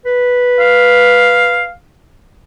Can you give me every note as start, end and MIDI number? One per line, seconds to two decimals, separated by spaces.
0.06 1.66 71
0.60 1.72 77